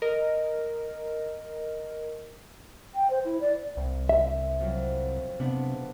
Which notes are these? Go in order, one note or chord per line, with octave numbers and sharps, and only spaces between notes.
A#4 D#5
G5
C5
E4
D5
C2
E5
F2 F#3
C3 B3 D4